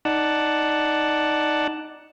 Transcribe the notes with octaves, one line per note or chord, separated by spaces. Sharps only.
D#4 D5 F#5 A5